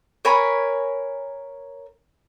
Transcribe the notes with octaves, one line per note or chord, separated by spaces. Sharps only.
A#4 C#5 G#5 B5